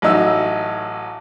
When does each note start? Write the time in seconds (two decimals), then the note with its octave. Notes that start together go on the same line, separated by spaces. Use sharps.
0.02 A1 F#3 D#4 E6